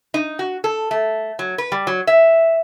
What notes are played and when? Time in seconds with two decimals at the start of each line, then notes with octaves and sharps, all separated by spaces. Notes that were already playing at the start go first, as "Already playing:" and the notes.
0.14 D#4
0.39 F#4
0.64 A4
0.91 A3
1.39 F#3
1.58 B4
1.72 G3
1.87 F#3
2.07 E5